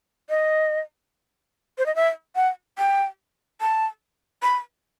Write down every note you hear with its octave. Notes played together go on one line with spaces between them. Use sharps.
D#5
C5
D#5
E5
F#5
G5
A5
B5